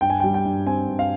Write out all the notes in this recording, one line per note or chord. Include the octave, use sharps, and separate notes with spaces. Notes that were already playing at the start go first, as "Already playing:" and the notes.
G2 G5
G#5
G5
G3
G5
G2
C4 G#5
G2
F5